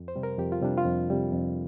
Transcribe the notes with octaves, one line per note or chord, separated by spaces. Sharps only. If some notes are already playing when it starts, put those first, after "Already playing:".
Already playing: F2
C5
C3 G3
A#4
F2 G4
F4
C3 G3 D4
F4
F2
C3 G3
F2